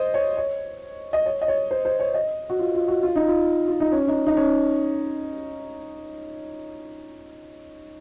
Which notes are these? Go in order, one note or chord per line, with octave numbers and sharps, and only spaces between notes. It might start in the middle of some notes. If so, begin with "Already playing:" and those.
Already playing: C5 D#5
C#5
C#5
D#5
C#5
D#5
C#5
C5
C5
C#5
D#5
F#4
F4
F4
F#4
F4
D#4
F4
F4
D#4
C#4
D#4
D#4
C#4